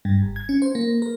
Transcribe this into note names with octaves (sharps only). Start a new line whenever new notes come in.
G2
G1
G#6
C#4
C5
A#3
A#4